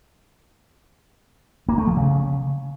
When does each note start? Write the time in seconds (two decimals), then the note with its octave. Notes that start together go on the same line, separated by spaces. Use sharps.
1.69 A#3
1.78 A3
1.87 F3
1.97 C#3